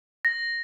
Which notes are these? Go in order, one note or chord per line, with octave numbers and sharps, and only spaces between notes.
A#6